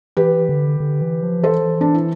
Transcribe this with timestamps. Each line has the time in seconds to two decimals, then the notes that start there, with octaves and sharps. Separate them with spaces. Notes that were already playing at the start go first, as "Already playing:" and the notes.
0.17 E3 G4 B4
0.49 D3
0.80 D3
1.02 E3
1.23 F3
1.43 E3 A4 C5
1.81 D4
1.94 E4